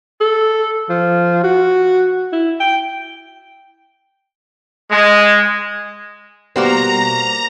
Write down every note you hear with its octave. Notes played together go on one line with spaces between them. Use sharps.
A4
F3
F#4
E4
G5
G#3
B2 G3 A#3 B3 F#4 C5 A#5